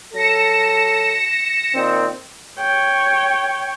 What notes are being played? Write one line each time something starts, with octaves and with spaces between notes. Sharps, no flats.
F#3 A4 A#6 C#7 E7
A#2 D#3 C4
C#5 G5